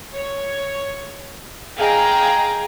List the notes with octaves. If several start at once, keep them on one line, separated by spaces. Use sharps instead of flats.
C#5
G#4 D#5 F5 G5 G#5 A#5